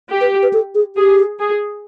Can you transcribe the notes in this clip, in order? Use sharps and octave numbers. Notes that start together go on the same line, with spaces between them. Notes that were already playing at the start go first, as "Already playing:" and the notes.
G4
B4
B4
A4
G#4
G4 G#4
G#4